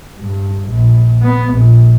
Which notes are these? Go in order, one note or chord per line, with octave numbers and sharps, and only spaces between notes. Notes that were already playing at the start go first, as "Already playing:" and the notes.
G2
A#1
B3
A#1